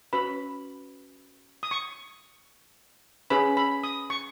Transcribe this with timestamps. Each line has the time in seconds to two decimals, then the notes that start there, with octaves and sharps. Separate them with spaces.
0.13 C#4 F#4 B4 B5
1.63 D#6
1.71 C#6
3.30 C#4 G#4 B4 B5
3.57 B5
3.84 D#6
4.10 C#6